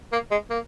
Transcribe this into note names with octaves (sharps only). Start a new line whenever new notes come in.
A#3
G#3
A#3